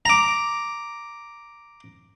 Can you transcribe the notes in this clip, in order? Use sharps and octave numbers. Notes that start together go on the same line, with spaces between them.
A#5 D6